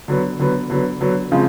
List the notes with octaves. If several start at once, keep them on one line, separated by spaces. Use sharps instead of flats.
D3 F#3 B3
D3 F#3 B3
D3 F#3 B3
D3 F#3 B3
C#3 F3 G#3 C4